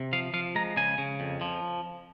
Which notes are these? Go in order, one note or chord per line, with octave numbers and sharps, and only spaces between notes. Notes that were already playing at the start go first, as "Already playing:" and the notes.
Already playing: C3
F3 F5
F3 F5
G#3 A#5
C#3 G#5
C#3
F2
F3